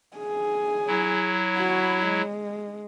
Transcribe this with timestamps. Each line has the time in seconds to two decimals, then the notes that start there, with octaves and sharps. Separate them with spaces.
0.17 G#4 G#5
0.88 F#3 E4
1.57 F#4 B5
2.07 G#3